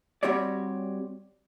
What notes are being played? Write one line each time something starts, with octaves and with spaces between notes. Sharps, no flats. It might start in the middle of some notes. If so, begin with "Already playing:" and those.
G3 C4 F#4 G4 C#5 D5